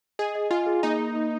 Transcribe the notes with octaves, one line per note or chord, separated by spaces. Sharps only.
G#4 D#5
D#5
F4 G#5
G#4
A#3 D#4
A#3
A#3